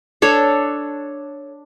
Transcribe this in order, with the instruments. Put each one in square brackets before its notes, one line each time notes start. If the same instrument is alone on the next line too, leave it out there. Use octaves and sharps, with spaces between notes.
[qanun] D4 A4 C#5